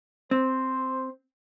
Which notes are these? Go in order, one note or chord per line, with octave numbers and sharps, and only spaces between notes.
C4 C5